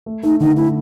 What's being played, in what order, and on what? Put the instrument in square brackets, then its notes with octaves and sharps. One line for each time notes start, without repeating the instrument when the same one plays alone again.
[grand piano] A3
[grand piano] A3 [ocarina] D#4
[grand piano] D3 [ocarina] D#4
[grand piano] A3 [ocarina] E4